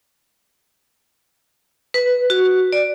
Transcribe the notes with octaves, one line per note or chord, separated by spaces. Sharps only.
B4
F#4
D5